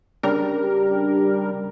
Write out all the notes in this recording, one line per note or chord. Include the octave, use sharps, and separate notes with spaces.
C#3 G3 D4 G4 A#4